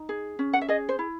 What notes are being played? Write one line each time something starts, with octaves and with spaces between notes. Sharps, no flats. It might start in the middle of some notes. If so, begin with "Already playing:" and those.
Already playing: D#4
G#4
C#4
F#5
E5
G#4 D#5
C5
E4